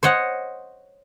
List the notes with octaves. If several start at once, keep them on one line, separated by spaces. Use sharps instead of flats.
C5 C#5 D#5 F#5